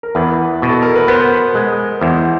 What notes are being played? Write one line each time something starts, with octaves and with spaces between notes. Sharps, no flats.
A#4
E2 B4
B2
A4
A#4
B4
B3 C5
G#3
E2 C5